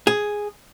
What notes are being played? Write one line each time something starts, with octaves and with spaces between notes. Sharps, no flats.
G#4